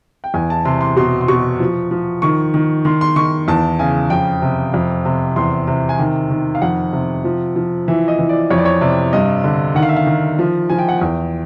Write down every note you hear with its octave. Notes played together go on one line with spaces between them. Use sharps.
G5
E2 G#5
A5
C3 C6
C6
B2 C6
C6
B2 C#6
F3
F3
D#3 C#6
D#3
D#3 C6
C6
D#3 C#6
E2 A5
C#3 G#5
F2 G5
C3
F2
C3
E2 C6
C3
G#5
D#3 G5
D#3
F5
F2 F#5
C3
F3
F3
E3 E5
D#5
E3
D5
F2 C#5
D5
C#5
C3 D5
G2 D#5
D3
D#3 F#5
F5
E5
F5
D#3
F3
F3 G#5
G5
F#5
E2 G5